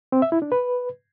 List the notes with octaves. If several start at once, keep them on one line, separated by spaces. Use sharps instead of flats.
C4
E5
E4
D4
B4